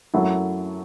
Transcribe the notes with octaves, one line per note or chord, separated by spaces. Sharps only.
F#2 F#3 A3 E4 A4